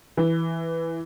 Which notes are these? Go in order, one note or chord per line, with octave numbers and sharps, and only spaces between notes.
E3